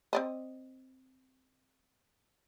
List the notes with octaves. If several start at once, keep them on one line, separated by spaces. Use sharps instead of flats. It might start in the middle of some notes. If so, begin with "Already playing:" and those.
C4 D5 D#5